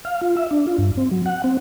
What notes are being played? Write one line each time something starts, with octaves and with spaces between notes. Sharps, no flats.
F5
F4
E5
D4
F4
G2
C4
F#3
F#5
C4